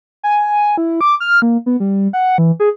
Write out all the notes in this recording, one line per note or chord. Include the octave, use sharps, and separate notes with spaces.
G#5
E4
D6
F6
A#3
B3
G3
F#5
E3
G#4